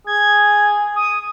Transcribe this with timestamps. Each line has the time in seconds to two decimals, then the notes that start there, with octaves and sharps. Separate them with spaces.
0.07 G#4 G#6
0.96 D#6